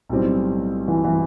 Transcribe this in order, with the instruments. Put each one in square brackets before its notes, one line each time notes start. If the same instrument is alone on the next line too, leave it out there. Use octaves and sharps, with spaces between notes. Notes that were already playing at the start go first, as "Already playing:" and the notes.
[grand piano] B1 A2 G3 C4
[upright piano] E3
E3